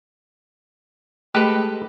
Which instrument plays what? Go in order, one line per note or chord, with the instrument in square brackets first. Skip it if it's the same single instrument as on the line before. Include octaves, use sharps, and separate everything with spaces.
[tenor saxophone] G#3 [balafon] A3 [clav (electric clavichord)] G4 A4 B4